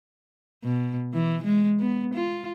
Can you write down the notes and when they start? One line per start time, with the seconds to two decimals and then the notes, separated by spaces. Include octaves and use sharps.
0.64 B2
1.14 E3
1.44 G#3
1.80 B3
2.14 F4